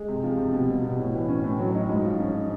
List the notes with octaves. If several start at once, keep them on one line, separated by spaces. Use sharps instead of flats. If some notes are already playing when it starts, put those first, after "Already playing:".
Already playing: G#3
C3
F3
C3
B2
G3
B2
A2
E3
C#4
A2
F#3
D#4
G#2
F3
C#4